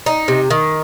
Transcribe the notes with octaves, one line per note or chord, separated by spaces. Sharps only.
D#4
C3
D#3